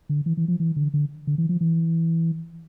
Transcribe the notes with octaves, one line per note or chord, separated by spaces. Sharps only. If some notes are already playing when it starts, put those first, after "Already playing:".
D3
E3
E3
F3
E3
D3
D3
D3
E3
F3
E3